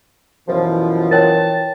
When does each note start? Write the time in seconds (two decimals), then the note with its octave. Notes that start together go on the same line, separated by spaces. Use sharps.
0.48 F#2 B2 E3 F3
1.11 A#4 C#5 G5 A5